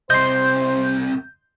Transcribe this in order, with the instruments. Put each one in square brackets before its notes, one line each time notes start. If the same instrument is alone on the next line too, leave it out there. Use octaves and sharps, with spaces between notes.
[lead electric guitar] C2 C3 [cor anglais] C5 [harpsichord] D#5 C6 [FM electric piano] G6